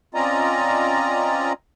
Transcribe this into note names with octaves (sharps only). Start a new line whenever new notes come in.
C4 C#4 F4 D5 D#5 A#5